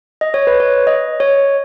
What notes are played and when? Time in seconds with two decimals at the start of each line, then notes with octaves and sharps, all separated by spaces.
0.21 D#5
0.34 C#5
0.47 B4
0.60 C#5
0.87 D#5
1.20 C#5